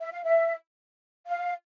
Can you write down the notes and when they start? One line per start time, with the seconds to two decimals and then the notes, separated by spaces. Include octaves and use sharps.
0.01 E5
0.12 F5
0.23 E5
1.27 F5